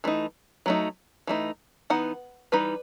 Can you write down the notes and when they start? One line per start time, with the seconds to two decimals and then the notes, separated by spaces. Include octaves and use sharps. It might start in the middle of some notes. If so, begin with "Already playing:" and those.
0.04 E3 A3 D#4
0.66 F#3 A3 D#4
1.27 E3 A3 D#4
1.90 E3 B3 D#4 F#5
2.52 E3 G3 D#4 B4